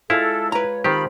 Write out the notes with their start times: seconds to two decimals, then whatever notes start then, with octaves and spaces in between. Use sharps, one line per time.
0.10 G#3 E4 F4 A4 F5
0.52 B4 C#5 A#5
0.84 D#3 C4 F4 G4 B5